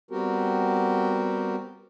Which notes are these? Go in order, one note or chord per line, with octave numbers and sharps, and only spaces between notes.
G3 B3 C4 F#4 G4 A#4